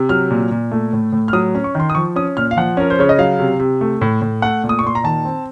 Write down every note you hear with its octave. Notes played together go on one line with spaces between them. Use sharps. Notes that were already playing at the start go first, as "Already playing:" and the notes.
Already playing: C3
F#3 F6
A#2
A#2
A3
A2
A2
F6
F#3 D#6
C#4
C#6
D#3 C6
D#6
F3 C#6
C#4 D#6
A#2 F6
F5
F3 F#5
C#4 A#4
C5
C#3 C#5
D#5
F#3 F5
C3
C3
A3
A2
A2
A3 F#5
A#2
D#6
C#6
A#2 C6
A#5
D#3 A5
C4